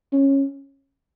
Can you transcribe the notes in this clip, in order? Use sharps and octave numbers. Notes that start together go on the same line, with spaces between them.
C#4